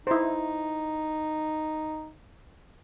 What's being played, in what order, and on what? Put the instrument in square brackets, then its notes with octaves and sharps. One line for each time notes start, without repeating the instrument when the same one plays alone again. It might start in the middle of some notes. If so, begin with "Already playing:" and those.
[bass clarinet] D#4 [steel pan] E4 C5